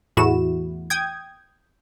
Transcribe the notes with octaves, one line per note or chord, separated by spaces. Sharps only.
E2 A2 E4 F#4 E7
G5 D#6 G#6